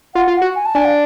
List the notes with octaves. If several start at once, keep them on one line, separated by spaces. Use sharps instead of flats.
F4 F#5
F4
F#5
F#4
G#5
A5
D4 G#5
F5